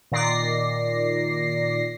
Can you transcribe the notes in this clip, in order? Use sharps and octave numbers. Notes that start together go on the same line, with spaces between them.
A#2 D#3 D5 A#6 C7